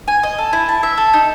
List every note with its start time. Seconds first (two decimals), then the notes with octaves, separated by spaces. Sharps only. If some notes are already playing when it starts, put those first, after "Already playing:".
0.08 G#5
0.23 D#5
0.38 A4
0.53 E4
0.69 A5
0.83 E5
0.98 A4
1.14 D#4